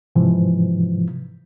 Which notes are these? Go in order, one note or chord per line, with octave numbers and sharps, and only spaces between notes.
G#2 C3 E3 F3